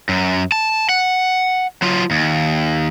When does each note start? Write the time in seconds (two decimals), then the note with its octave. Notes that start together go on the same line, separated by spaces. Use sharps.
0.09 F#2
0.52 A5
0.89 F#5
1.82 F#3 F4
2.11 D#2